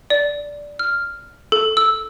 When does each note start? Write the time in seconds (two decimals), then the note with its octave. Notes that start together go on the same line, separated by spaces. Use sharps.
0.10 D5
0.79 F6
1.52 A4
1.77 E6